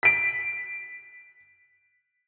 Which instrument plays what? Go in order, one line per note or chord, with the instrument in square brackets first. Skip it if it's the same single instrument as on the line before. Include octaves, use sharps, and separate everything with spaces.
[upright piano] B6 D7